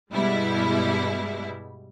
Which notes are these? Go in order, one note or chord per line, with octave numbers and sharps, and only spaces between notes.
G2 B2 G3 G#3 E4